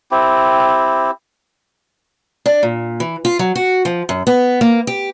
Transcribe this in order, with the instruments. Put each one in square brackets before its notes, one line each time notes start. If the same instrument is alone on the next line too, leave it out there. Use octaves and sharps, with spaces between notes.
[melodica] C4 E4 G4
[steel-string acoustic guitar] D4
A#2
E3
F4
F#3
F#4
F3
F#2
B3
A#3
G4